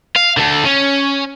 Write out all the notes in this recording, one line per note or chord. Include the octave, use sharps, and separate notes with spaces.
F5
D3 A3
C#4